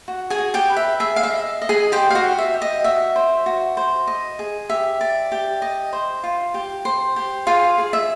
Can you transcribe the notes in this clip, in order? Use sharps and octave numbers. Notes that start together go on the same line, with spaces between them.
F#4
G#4 G#5
F#4
G4 G5
B4
E5
G#4 E5
F5
E5
D#5
D#5
G#4 G#5
G4 C5 G5
F5
F#4 F#5
G4
E5
G4
D#5
F#4 E5
C5
F#4
C5
D#5
G#4
G4 E5
D5
G4
D#5
C5
F4
G4
C5
G4
F4 G#4 F5
G#4
E5